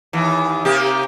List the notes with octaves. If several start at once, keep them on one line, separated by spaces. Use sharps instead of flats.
D#2 E3
C3 A#3 G4